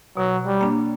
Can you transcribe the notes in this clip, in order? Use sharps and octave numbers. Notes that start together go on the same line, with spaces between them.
B2 F#3
G3
A#3 D4